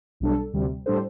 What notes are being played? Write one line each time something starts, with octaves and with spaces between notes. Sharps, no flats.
B1 B2 G3 D4 A4
D2 C3 G3
A2 G3 D4 A4 C5